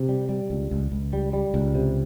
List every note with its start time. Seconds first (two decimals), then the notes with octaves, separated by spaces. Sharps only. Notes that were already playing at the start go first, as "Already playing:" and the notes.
Already playing: C3
0.09 G3
0.29 G3
0.50 C#2
0.71 C#2
0.92 C#2
1.13 G3
1.33 G3
1.54 C#2
1.75 C3